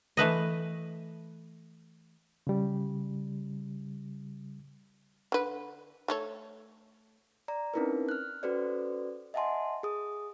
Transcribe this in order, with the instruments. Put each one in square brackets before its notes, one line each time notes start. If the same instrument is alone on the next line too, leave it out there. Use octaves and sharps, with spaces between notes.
[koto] E3 A3 B4 D#5
[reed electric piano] C#3 G3
[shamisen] D3 B4
A3 A4 C#5
[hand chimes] D5 A#5
C4 C#4 D#4 E4 A#4 B4
F6 F#6
C#4 F#4 A4 B4 C5 D5
D#5 E5 F#5 G#5 A5 C6
G#4 D#6